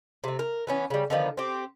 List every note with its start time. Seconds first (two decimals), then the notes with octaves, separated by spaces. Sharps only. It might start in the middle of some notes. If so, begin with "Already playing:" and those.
0.24 C3 A3
0.39 A#4
0.67 E3 B3 C#4
0.90 C#3 G3
1.10 D3 D#3 F3 B3
1.37 C4 G4